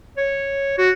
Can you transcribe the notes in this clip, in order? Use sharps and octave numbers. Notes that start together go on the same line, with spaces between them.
C#5
F#4